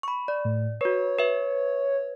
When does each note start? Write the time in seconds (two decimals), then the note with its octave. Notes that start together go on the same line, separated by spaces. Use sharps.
0.03 B5 C#6
0.28 D5
0.45 A2
0.81 F#4 B4 C#5
1.19 B4 E5